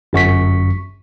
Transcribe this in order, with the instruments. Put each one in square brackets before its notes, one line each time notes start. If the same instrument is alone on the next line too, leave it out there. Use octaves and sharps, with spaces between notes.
[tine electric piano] G1 F#2 C#6 B6